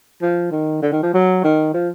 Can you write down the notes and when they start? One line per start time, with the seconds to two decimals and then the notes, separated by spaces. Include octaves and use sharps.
0.22 F3
0.52 D#3
0.82 D3
0.92 D#3
1.03 F3
1.14 F#3
1.44 D#3
1.74 F3